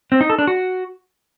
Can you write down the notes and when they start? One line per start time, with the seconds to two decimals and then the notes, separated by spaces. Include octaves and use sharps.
0.12 C4
0.21 D#4
0.30 A4
0.39 D4
0.47 F#4